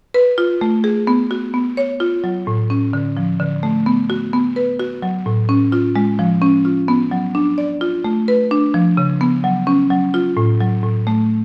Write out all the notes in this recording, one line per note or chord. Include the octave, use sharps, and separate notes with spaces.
B4
F4
A3
G#4
B3
F#4
B3
C#5
F4
F#3
A2
C#4
D3
F3
D3
A3
B3
F#4
B3
B4
F#4
F#3
A2
C#4
F4
G#3
F3
C#4
F4
B3
F#3
D4
D5
F4
A3
B4
D4
F3
C#3
B3
F#3
C#4
F#3
F4
A2
F#3
A2
A3